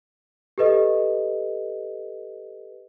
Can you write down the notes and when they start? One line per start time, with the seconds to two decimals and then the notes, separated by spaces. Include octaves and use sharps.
0.58 G4 A4 B4 D#5